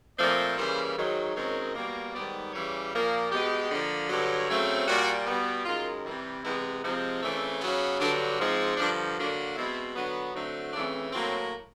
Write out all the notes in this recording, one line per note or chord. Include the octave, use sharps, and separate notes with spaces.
A#2 F3 A3 C4 D5
C#3 E3 G3 A#3 C5
G#2 D#3 F#3
F#2 D#3 G#3 C4 C#5
B2 G3 A#3
G#2 D#3 G3 B3 D5
C#3 E3 G3 C#5
A#2 F3 A#3
B2 G#3 B3 G4
D3 F3 A#3
G2 D3 F#3
C#3 F#3 A3 C4
A#2 G3 A#3 F#4
B2 G3 B3
F#2 D#3 G#3 F4
C3 E3 G3
C3 E3 G#3 B3 E4
C3 F3 G#3 C4 D#4
C#3 E3 A3 C4 D4
C#3 F#3 B3
G2 D3 F#3 D4
G#2 F3 G#3 C4
G2 D3 F3 D4
D3 F#3 A#3 D4
B2 G#3 C4 E4
D3 F#3 B3
D3 F#3 A3 C4 D#4
C#3 E3 A3 C4 D4
A2 F#3 A#3 C4